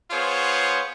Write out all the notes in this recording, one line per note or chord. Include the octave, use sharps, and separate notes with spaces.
B3 F4 G#4 C5 C#5